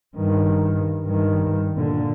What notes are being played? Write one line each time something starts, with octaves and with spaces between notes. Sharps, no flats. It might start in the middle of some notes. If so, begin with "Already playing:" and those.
G2 D#3
G2 D#3
A#2 D3